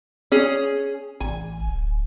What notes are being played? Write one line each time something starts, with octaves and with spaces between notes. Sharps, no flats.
C#4 G#4
A1 G#5
D1